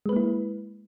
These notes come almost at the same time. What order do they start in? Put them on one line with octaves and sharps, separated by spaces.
G#3 B4 A#3 E4